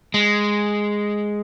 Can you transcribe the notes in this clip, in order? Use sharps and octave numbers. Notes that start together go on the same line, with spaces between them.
G#3